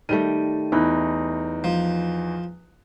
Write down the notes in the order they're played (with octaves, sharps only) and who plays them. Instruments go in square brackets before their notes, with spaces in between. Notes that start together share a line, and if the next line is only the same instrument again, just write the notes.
[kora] D#3 G3 A3 [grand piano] D#7
[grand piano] E2 D#4 F#6 [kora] E4
[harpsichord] F3